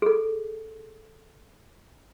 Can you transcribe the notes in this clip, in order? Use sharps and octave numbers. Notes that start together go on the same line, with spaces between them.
G#4 A4